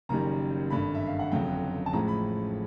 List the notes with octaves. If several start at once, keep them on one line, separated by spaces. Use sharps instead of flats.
F#1 F#2 D#3 G3 A#5
G#1 G2 D3 B5
E5
F5
F#5
G1 F2 C#3 F#3 G5
A5
A1 A2 F3 G#3 A#5
B5